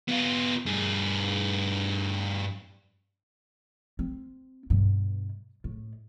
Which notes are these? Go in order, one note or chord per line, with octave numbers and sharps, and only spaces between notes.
B3 F4
G2 G#4
C4
G2 B2
A2